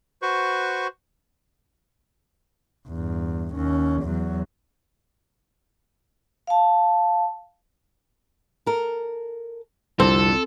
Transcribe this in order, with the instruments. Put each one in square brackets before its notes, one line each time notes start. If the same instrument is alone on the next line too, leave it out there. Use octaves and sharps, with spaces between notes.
[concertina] F#4 B4 C5 C#6
[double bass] E2 G2
D#2 C#4
E2 F#3
[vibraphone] F5 A5
[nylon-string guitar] A4 A#4
[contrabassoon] C2 [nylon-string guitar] F2 D3 [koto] C4 [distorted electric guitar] A4